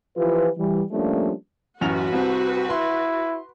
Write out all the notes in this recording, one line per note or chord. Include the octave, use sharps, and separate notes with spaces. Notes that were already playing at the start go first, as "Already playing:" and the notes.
E3 F3 F4 G4 B4
E3 G3
F3 G3 A3 A#3 C#4 D4
A1 F#2 F#4 B4 F7
C2 C3 C4
E4 C6